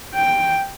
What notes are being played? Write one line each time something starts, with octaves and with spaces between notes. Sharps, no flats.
G5